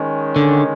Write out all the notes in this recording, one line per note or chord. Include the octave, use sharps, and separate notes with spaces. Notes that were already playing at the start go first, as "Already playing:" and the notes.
Already playing: D#3 G#3 C#4
D3